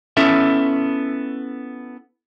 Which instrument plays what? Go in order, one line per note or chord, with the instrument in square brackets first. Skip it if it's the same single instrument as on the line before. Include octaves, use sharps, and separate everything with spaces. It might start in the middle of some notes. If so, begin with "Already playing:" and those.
[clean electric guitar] B3 C#4 E4 A4 E5